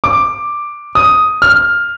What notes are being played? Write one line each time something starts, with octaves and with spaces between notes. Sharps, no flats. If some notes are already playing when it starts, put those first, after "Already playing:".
D6
D#6
F6